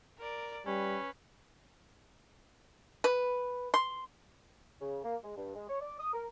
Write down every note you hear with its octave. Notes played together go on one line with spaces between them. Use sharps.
A#4 D5
G3 C#4 B4
B4
C6
C#3
A#3
G#3
G2
G#3
C#5
D5
D#6
A#4